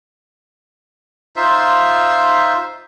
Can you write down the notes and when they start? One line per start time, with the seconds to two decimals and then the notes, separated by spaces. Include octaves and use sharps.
1.36 D#4 F4 C5 E5